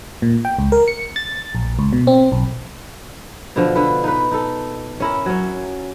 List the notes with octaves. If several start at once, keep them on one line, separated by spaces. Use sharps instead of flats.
A#2
G5
C#2
A#4
C#7
A6
A#1
C#2
B2
C4
B1
B2 D3 F3
D3 B4
D#4 B4
D#4 A4
C#4 E4 A#4
F#3 C#4